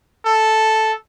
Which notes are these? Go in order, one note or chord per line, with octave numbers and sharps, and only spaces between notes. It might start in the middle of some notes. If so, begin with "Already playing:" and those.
A4